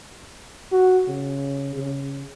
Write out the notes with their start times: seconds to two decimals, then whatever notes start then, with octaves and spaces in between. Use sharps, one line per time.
0.72 F#4
1.08 C#3
1.76 C#3